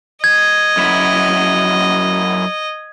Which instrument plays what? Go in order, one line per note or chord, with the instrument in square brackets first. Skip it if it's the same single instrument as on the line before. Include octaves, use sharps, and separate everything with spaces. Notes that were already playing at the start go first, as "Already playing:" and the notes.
[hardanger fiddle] D#5 [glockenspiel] G#6
[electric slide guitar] F#2 E4